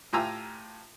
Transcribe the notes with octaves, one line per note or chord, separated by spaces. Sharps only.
A2 F4 G4 G#5 A#5 E6